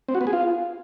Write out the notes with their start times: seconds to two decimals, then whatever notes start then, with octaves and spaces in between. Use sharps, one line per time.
0.08 C4
0.15 F#4
0.21 B3
0.27 G#4
0.33 F4